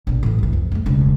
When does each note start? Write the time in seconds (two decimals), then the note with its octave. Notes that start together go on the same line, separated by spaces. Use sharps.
0.07 A#1 B2
0.23 A2 E3
0.39 C2 E3
0.53 F2
0.72 G#3 A3
0.86 E1 C#2